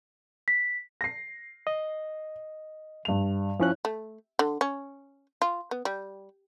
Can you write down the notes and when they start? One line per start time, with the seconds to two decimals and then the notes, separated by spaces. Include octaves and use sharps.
0.48 B6
1.01 A#6 C7
1.67 D#5
3.05 G2 F7
3.60 F3 C#4 E4 C#5 F#6
3.85 A3
4.39 D3
4.61 C#4
5.42 F4
5.71 B3
5.85 G3